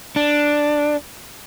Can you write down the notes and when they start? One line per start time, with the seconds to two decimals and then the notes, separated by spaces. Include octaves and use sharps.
0.16 D4